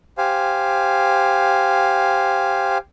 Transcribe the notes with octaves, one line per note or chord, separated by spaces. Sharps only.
G4 C5 F5 G#5